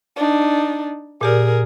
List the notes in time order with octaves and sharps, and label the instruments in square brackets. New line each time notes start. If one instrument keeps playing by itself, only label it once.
[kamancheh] D4 D#4
[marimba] A#2 G4 D5 [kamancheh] G#4 A#4